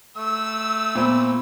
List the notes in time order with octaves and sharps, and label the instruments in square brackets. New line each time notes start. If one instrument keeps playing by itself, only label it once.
[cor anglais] A3 [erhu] E6
[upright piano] A#2 C4 B5 [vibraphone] B3